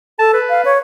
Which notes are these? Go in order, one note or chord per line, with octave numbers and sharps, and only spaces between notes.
A4 A5
B4
F5
C#5